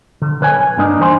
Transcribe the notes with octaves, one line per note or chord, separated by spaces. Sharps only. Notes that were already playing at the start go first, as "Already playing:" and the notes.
D3
B1 B4 C#5 G#5
G2 A#3 D4 D#4
E3 D#4 C5 G#5 C6